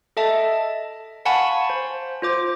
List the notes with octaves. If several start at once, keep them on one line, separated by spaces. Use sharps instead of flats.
A4 D#5 E5 A5
A5
F5 F#5 G#5 A5 B5 C#6
C5
F4 C5 D6